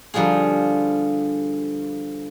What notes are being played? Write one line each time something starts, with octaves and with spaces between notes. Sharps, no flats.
D3 F3 G3 F4 G#4